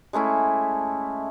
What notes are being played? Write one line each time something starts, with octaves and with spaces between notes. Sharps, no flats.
G#3 A3 C#4 E4